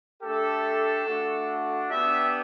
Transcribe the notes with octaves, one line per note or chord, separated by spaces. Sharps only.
A3 D4 G4 A4
A3 D4 F#4
B3 D4 G4 E5